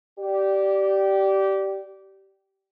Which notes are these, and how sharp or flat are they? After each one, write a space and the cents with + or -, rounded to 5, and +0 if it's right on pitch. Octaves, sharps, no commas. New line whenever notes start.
G4 -20 D5 +0